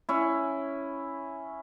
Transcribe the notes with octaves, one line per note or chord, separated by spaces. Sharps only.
C#4 E4